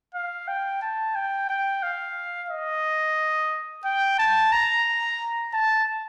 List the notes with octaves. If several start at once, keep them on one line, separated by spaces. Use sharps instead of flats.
F5
G5
A5
G5
G5
F5
D#5
G5
A5
A#5
A5